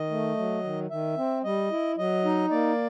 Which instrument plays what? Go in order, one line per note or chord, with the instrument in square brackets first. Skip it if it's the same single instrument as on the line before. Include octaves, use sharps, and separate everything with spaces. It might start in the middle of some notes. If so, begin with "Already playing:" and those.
Already playing: [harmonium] D#3 D#5
A3
F#3
D#3
D#3 E5
C4
G3 D#5
E4
F#3 D#5
D#4
A#3 D5